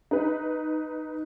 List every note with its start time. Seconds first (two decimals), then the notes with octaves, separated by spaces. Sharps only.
0.11 D#4 B4